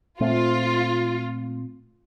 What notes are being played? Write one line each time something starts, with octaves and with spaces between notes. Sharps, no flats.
A#2 A3 C4 F4